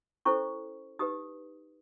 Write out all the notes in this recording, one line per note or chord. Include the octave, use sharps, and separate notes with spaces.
C#4 E4 A4 C5 C#6
D#4 G4 B4 D#6